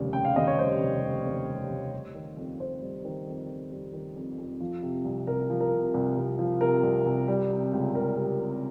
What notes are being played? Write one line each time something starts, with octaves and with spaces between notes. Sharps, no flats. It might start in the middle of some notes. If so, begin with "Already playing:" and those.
Already playing: F1 D#2 C#3 G3
C#3 G5
F5
D#2 D#5
C#5
G3 C5
F1
C#3
D#2
G3
F1
G3
D#3
F2
F2 C5
G3
D#3
F2
F2
G3
D#3
F2
F2
F3
C3
C2
C2 A#4
F3
A#4
C3
C2
C2
F3
C3 A#4
C2
C2
G3
C3
C#2
C#2 A#4
G3
C3